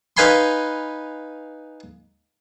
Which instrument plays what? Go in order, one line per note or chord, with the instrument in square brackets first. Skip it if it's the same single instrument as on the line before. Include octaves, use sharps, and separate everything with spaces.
[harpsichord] D#4 B4 F5 G#5 B5 C6